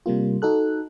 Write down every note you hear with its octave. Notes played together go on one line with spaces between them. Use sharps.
C3 G3 A#3 F4
D#4 F#4 A4 F#6